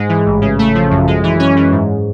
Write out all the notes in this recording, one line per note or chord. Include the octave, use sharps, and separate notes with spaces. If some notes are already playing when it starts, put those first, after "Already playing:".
Already playing: G#2 G#3
E3
A1
C#3
A3
F3
F#2
G#3
E3
C#4
E3
G#2